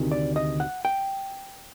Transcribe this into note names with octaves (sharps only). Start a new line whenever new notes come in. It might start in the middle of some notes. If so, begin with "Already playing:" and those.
Already playing: D2 C3 D#3
D5
D#5
F#5
G5